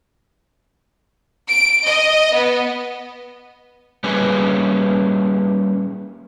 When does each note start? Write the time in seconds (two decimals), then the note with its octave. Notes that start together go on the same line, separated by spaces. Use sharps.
1.49 D7
1.86 D#5
2.33 B3
4.04 G3 A#3 C#4 G#4 B4